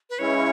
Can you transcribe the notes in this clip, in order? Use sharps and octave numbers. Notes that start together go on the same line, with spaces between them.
B4
C#3 G#3 C#4 E4 C#5